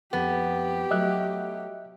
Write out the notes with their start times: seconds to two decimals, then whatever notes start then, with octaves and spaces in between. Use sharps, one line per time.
0.13 F2 B3 G4
0.91 F#3 A3 D#5 E5 F#6